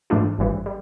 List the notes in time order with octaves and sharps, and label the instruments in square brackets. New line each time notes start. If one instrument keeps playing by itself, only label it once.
[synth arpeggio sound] G#2 E3 A3 D4 F4
G#1 G2 E3 G3
G3